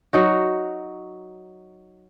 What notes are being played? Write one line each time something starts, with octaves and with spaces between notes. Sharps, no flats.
F#3 D#4 F#4